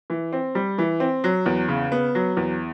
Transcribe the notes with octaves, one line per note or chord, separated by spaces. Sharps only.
E3
C4
G3
E3
C4
F#3
E2
C#3
B3
F#3
E2